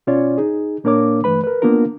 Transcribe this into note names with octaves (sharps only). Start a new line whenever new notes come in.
B2 C#4 F4 C#5 D5
D#4 G#4
A#2 A#3 D4 A#4 C#5 D6
G2 E3 A3 B4 B5
A#4 B4
A#3 B3 D4 F4 A#4